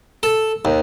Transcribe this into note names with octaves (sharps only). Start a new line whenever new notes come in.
A4
D#2